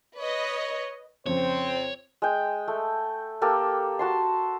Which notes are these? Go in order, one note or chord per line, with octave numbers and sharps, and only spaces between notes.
B4 C#5 D#5
F2 C#3 C4 C5 C#5
G#3 G5
A3
A#3 G4 A4
F#4 A5 C6